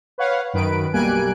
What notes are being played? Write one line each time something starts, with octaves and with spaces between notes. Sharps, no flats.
B4 C#5 F5 F#5
F#2 D#3 B4 D7
B1 G3 A#3 G#5 F#6 D7